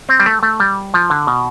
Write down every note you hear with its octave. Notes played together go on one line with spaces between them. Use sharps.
C4
G3
A3
A3
G3
F3
D3
B2